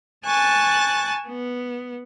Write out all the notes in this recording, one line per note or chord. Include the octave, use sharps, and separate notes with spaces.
G#5 A5 C#6 F#6 A6
B3